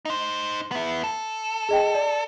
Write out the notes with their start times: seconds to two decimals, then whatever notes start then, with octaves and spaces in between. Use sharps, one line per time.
0.05 D#4 C5
0.71 B3 E4
1.04 A4
1.69 G#4 D#5 G5
1.95 D5